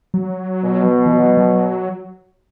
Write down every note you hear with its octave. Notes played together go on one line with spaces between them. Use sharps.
F#3
B2
E3
F#3
F#3